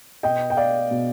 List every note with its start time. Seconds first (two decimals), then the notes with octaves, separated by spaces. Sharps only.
0.23 B2 B3 D#5 G5
0.50 G5
0.57 D5 F5
0.91 B2 B3